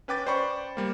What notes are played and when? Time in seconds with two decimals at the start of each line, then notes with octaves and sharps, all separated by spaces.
0.08 C#4 B4 G5 D6 A6
0.27 C5 D5 G5 B5 C#6
0.77 G3 A#3